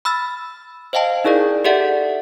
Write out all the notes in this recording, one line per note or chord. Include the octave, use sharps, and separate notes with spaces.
B5 E6 F6 A6
C5 D#5 F5 G5 A5
D#4 E4 G#4 A#4 D5
G4 A4 D5 E5 F#5